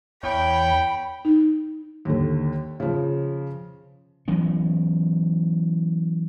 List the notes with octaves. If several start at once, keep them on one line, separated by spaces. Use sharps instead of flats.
E2 C#5 G5 B5
D#4
D#2 D3
C#3 F3
E3 F#3 B3 C#4